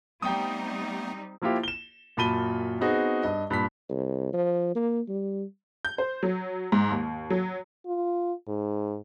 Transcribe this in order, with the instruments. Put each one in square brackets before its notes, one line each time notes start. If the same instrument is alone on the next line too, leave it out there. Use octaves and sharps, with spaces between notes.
[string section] G3 C4 D#4 [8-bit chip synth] A3 B3 [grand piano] G5 D#6
[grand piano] F3 A#3 E4 F4 G4
E7 G7
F#2 A#2 A5 B5 D#7 G7
B3 C4 D#4 F#4 G#4
G2 D#5
G2 A#2 B5 B6
[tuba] C2
F3
A#3
G3
[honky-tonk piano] G6
C5
F#3
G#2
D#2
F#3
[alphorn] F4
G#2